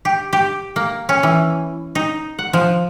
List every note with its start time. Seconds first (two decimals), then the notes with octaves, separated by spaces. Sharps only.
0.05 G4
0.33 G4
0.76 A#3
1.09 C#4
1.23 E3
1.95 D#4
2.39 F#5
2.53 F3